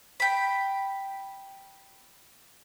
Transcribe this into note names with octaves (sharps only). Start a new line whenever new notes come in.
G5 B5